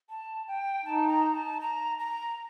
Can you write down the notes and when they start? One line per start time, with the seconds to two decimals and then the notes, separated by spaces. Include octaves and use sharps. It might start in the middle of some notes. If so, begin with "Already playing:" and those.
0.09 A5
0.48 G5
0.85 D#4 A5
1.10 A#5
1.35 A5
1.61 A#5
1.99 A#5